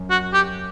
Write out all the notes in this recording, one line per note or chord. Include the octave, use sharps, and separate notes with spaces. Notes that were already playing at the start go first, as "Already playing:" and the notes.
Already playing: F#2
F#4
G4